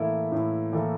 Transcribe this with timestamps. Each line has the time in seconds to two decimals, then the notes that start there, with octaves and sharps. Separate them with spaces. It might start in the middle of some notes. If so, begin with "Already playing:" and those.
Already playing: A2 E3 A#3 E4 A4
0.32 A2
0.72 E3 A#3 E4 A4